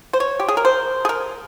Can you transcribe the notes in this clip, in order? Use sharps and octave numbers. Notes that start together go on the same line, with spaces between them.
C5
C#5
G4
G#4
A#4
C5
G#4
A#4